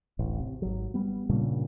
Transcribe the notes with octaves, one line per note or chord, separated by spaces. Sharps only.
D1 A1
C3
G#1 F#3
G3 B3
G2 A#2 C#3 G3